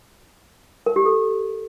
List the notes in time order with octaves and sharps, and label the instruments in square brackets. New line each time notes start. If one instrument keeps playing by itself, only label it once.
[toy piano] A#4
G4
A4